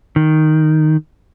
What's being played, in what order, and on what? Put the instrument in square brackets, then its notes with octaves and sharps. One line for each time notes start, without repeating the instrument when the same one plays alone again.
[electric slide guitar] D#3